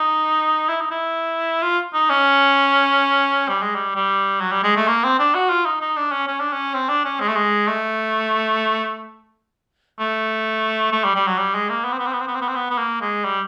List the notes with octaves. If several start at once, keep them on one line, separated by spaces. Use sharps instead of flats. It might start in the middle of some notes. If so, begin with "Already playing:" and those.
Already playing: D#4
E4
D#4
E4
F4
D#4
C#4
G3
G#3
G3
G3
F#3
G3
G#3
A3
A#3
C4
D4
F#4
F4
D#4
D#4
D4
C#4
C#4
D4
C#4
C4
D4
C#4
G#3
A3
G#3
A3
A3
A3
G3
G3
F#3
G3
G#3
A#3
B3
C4
B3
C4
B3
C4
B3
C4
B3
C4
B3
B3
A#3
G#3
G3